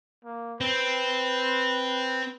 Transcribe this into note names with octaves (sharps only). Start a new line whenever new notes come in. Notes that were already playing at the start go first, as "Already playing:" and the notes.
A#3
C4 B4